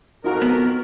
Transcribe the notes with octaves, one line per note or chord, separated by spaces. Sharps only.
F2 D#4 F4 F#4 A#4
B3